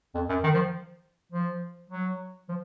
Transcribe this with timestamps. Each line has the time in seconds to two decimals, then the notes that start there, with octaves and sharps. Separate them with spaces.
0.15 F2
0.29 F#2
0.44 D#3
0.54 F3
1.32 F3
1.90 F#3
2.49 F3